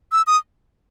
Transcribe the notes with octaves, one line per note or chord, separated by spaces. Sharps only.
E6
D#6